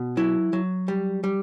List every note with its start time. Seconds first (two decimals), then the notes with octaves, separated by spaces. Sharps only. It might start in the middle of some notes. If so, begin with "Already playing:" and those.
Already playing: B2
0.17 F#3 E4
0.53 F#3
0.88 G3
1.24 G3